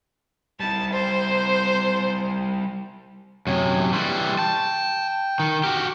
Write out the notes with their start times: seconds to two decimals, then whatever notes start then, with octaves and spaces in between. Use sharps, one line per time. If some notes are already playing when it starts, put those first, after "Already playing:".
0.60 G3 E4 A5
0.93 C5
3.47 F#2 C3 C#5
3.93 E3 G3 C6 C#6
4.39 G5 A5
5.40 D#3
5.64 F#4 G4 F6